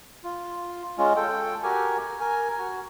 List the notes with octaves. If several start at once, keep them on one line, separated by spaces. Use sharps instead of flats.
F4
G#3 C#4 F4
A4 G5
F#4 G4 A#4 G#5
A#4 G#5
F#4